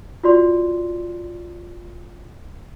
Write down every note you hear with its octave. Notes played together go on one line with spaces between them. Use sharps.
F4 F#4 D5 C6